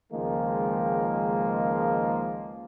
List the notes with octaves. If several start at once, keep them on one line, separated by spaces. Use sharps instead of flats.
C#2 D#3 F3 G#3 A#3